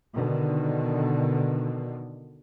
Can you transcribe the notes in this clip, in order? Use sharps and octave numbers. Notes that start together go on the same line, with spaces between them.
B2 D3 D#3